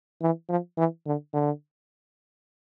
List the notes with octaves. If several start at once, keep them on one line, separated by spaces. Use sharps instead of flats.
E3
F3
E3
D3
D3